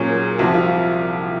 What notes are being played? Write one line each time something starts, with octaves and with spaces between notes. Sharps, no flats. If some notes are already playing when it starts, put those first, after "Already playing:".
Already playing: A#2 F#3 C#4 F#4 G#4
A#4
C2 C3 F3 F#4
F4